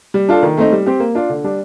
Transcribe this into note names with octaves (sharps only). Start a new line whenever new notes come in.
G3
D4 F4 A4
D#3
A3 C4 D#4
G3
C4 G4
A#3
D4 F4
D3
G3 D4